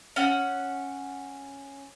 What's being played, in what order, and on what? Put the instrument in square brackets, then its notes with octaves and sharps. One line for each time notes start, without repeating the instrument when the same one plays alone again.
[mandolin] C#4 F#5